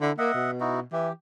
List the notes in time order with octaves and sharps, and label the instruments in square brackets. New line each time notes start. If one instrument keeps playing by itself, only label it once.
[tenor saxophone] D3 [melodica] E4
[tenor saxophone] A#3 [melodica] D#5 E5 F#5
[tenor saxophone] B2
[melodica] D#4 E4 F#4
[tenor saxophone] E3 [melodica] G4